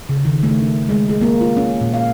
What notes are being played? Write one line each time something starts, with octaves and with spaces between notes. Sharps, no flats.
C#3
D#3
A3
D4
G#3
G#4
A#3
F4
C#4
A#2
F5